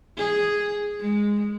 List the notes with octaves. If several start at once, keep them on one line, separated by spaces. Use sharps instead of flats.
G#4
G#3